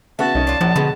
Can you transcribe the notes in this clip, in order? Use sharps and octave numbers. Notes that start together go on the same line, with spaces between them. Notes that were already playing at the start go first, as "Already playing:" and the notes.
C#3 B3 F#4 E5 A5
C2 D#3 C#4 D#5
D4 F4
A#1 F3 F#3
B2 D3 G#3 B3